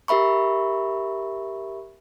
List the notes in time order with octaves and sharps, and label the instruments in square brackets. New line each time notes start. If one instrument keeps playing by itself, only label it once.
[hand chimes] G4 A#4 E5 B5 C#6